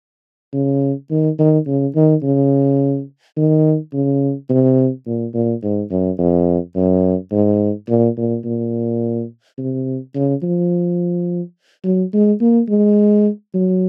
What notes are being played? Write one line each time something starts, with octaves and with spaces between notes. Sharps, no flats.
C#3
D#3
D#3
C#3
D#3
C#3
D#3
C#3
C3
A#2
A#2
G#2
F#2
F2
F#2
G#2
A#2
A#2
A#2
C3
C#3
F3
F#3
G#3
A#3
G#3
F#3